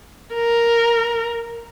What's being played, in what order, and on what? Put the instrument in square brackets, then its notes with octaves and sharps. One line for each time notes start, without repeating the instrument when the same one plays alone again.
[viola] A#4